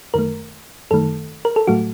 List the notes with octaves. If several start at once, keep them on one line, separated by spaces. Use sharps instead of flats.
F#2 D#3 A3 A#4
F#2 D#3 A3 A4
A#4
A4
A2 F#3 A3 F#4